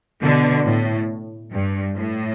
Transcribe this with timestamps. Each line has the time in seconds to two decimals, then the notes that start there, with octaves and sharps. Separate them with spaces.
0.22 B2 D3
0.65 A2
1.52 G2
1.95 A2